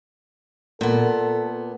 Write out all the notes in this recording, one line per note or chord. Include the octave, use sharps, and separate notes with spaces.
A#2 B3 A4